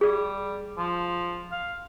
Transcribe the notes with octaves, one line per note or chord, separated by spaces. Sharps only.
G3 G#4 D5
F3
F5